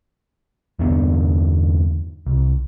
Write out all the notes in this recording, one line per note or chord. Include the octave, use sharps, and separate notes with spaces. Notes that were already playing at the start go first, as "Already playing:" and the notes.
E2 G2 D3 B3
C2